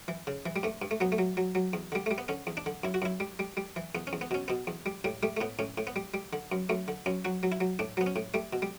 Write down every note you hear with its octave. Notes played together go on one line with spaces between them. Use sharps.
E3
C#3
E3
G3
G2 A3
G2
A3
F#3 B3
A3
F#3
F#3
F#3
E2
D3 G3
G3 A3
B3
D3 C#4
E2
D4
D3
F#2 E4
F#4
F#2 E4
G3
G3
G3
E3
E2 B3
C#4
E2
B3
B2 C#4
B2 B3
E2
G3
A2 G3
G3 A3
A3
A2 B3
A2 C#4
A2
B3
G3
G3
D3
F#2
F#2 A3
D3
F#2 C#4
F#3 F#4
F#3
E4
F#3
A2 D4
F#3 B3
C#4
A2
G3 A3
B2
G3